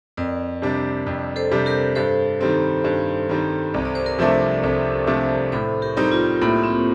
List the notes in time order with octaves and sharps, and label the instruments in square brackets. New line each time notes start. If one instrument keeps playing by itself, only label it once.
[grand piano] F2 [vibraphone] A#4 D5
[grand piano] C3 G3 D4
F2
[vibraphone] A4 C5
[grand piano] C3 G3 D4
[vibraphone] G4 A#4
[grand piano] G2 [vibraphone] A4 C5
[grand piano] D#3 G3 C4
G2
D#3 G3 C4
C2
[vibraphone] D5
C5
A#4 D5
[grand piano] C3 F3 A3 D4
[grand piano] C2 [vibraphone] A4 C5
[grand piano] C3 F3 A3 D4
[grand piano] A2 [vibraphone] A4 C5
[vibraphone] G4 A#4
[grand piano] G3 C4 D#4
[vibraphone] F4
[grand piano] A2 [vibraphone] A#3
[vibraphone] C4